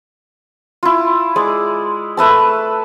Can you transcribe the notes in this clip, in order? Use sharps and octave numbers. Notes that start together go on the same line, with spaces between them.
E4 F4
G#3 D5
A3 B4 E5 A5